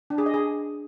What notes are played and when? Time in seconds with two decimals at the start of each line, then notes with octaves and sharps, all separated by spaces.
0.10 D4
0.18 G#4
0.26 D#5
0.34 G#4